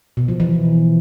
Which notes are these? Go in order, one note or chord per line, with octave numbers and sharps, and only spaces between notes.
B2
F3
E3